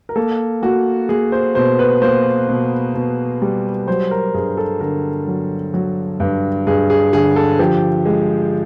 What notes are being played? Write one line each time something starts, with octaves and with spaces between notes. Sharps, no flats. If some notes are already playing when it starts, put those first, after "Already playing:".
A#4
A#3 A4
A#3 F#4
A#3 G#4
C5
B2 C5
B4
A#3 C5
B2
B2
G3
F#3 C5
A#4
G2 G#4
A4
D3 A#4
F#3
F#3
G2
G2 G#4
G#4
D3 G#4
A4
F3 G4
G#3